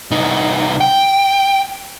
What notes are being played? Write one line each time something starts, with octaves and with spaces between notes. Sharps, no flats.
C2 D#4
G5